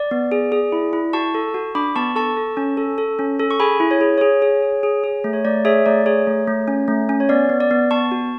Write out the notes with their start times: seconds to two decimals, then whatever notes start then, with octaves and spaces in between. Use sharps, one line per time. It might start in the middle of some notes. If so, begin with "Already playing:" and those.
Already playing: D5
0.11 B3
0.32 G#4
0.52 G#4
0.72 E4
0.93 E4
1.13 F#4 A5 C#6
1.34 A4
1.54 F#4
1.75 D4 B5 D6
1.96 B3 A5 C#6
2.16 A4 A5 C#6
2.37 A4
2.57 C#4
2.77 A4
2.98 A4
3.19 C#4
3.39 A4
3.51 C#6
3.60 G#4 G#5 B5
3.80 E4
3.91 C#5
4.01 G#4
4.18 G#4 C#5
4.42 G#4
4.62 G#4
4.83 G#4
5.04 G#4
5.24 A3
5.33 C#5
5.44 A3 D5
5.65 G#4 C#5 E5
5.86 A3 D5
6.06 G#4 C#5
6.27 A3
6.47 A3
6.68 C#4
6.88 A3
7.09 C#4
7.20 C#5
7.29 B3 D5
7.50 B3
7.60 D5
7.71 B3
7.91 B3 A5 C#6
8.11 F#4